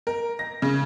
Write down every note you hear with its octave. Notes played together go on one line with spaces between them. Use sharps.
A#4
A#6
C#3